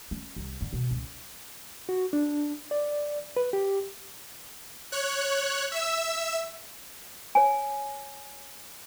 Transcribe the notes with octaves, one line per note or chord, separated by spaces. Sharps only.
C#4
C2
D3
B2
C#2
F#4
D4
D5
B4
G4
C#5 F#6
E5 E6
C#5 G#5